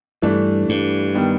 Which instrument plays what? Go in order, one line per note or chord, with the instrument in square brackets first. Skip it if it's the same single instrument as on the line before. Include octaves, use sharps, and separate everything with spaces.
[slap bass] G2 [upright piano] E3 A3 D4
[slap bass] G2
[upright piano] D#3 G3 B3